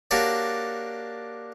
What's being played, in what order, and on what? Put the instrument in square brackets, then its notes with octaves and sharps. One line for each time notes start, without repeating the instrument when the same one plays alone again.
[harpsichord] A#3 D4 F#4 G4 C#5 D5